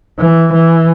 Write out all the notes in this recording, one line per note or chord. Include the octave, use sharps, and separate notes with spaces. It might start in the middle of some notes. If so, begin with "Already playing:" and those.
E3
E3